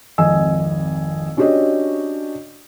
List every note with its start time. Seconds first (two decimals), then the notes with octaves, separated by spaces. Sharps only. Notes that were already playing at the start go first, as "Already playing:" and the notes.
0.18 G#1 F2 D#5 G#5 E6
1.37 C#4 D4 F#4 G4 C#5 D#5